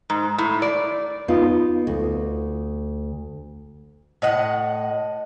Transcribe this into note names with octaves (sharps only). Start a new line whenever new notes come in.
G#2
A2
D5
B3 D#4 F4
D2
A2 D#5 F#5